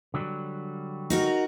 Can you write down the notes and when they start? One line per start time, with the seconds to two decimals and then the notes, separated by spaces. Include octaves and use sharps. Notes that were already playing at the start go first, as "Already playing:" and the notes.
0.14 D3 F#3 G3
1.10 D#4 F#4 A#4